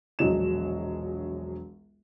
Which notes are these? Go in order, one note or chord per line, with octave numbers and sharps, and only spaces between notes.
E1 A#1 F#3 D#5 E7